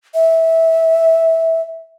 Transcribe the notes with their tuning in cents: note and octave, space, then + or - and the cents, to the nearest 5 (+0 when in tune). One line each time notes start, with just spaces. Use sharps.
E5 -15